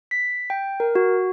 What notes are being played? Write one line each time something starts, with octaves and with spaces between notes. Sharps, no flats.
B6
G5
A#4
F#4